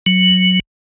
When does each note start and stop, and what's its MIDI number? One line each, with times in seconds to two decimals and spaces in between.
0.06 0.60 54